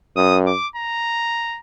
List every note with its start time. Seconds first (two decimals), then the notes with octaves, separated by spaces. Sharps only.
0.16 F#2 D#6
0.46 D6
0.76 A#5